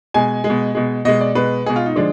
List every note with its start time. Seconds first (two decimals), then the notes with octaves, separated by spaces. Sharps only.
0.14 B2 G#3 G#5
0.44 G#3
0.50 B2
0.75 B2 G#3
1.05 B2 G#3 D#5
1.21 D5
1.35 B2 G#3 B4
1.66 B2 G#3 G#4
1.76 F4
1.86 D#4
1.96 D3 F3 G#3 D4